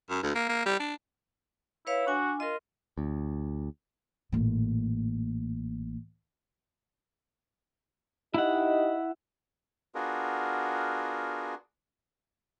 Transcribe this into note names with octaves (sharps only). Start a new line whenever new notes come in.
F#2
D2
A#3
A#3
G3
D4
E4 B4 C#5 F5
D4 F#4 G#5
F4 A#4 D#5
D2
A1 A#2
D#4 E4 G4 D#5 F#5
B3 D4 F4 F#4 G#4 A#4